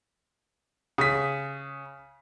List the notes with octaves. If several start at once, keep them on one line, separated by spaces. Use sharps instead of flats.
C#3 D#6 B6